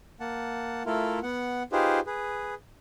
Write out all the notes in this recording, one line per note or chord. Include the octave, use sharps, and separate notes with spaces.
A#3 F#5 A5
A3 E4 F4 A4 A#4
B3 F#5
D#4 F4 G4 G#4 B4 C5
G#4 B4